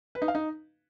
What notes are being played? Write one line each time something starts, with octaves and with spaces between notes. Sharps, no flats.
B4
D#4
F5
D#4